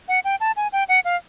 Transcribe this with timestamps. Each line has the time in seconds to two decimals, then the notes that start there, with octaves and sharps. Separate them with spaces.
0.08 F#5
0.24 G5
0.40 A5
0.56 G#5
0.73 G5
0.89 F#5
1.05 F5